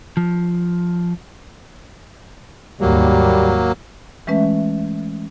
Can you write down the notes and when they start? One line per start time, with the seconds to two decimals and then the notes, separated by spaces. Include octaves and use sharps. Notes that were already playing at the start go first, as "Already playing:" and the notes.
0.17 F3
2.81 D#2 G#2 F#3 G3 A#3
4.27 E3 G#3 A3 C#4 B4 E5